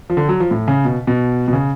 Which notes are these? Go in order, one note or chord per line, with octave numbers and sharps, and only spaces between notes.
F3
D3
F#3
F3
A2
C#3
B2
B2
B2
C#3